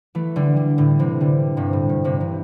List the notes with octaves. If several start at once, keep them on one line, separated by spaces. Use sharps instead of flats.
E3 A3
D3 G3
D3 G3
A2 D3
C3 E3
D3 G3
G2 C3
A2
G2
G2 C3
C3 E3